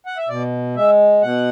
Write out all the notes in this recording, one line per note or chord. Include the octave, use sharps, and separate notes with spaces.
F#5
E5
B2 D5
G#3 E5
B2 F#5